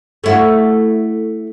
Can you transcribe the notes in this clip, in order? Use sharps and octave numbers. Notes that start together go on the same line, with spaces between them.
A3 E4 F#4